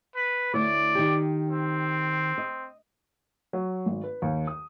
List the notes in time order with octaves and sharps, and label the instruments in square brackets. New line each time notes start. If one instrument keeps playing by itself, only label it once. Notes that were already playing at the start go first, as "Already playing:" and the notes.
[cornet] B4
[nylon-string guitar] D2 E4 C#5 [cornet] D5
[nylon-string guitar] D#3 G4
[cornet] C4
[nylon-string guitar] D#5
[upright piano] F#3
G#1
B4
D#2
D#6